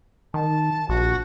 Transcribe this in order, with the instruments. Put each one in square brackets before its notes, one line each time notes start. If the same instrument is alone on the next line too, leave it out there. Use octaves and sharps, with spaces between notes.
[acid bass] D#3 [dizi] A5
[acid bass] A#1 [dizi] F#4